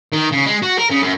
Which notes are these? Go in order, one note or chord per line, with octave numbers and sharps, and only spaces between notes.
D#3
C#3
G#3
F#4
A#4
C#3
F#2